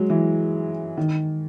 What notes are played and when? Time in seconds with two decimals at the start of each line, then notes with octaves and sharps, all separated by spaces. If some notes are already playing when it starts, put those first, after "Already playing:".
Already playing: F#3 G#3
0.10 E3
0.97 D#3